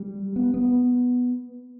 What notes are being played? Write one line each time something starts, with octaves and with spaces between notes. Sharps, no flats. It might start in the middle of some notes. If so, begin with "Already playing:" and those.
Already playing: G3
B3
B3